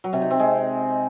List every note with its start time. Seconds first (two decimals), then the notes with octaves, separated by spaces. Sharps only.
0.04 F#3
0.13 C3
0.22 D#4
0.31 C4
0.39 G#3